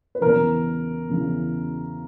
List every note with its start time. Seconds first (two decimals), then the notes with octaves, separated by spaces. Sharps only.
0.15 B4
0.21 E2 C#3 E3 A#4
1.10 E2 C#3 E3